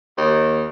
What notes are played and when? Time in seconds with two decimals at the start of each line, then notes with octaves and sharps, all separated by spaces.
0.17 D#2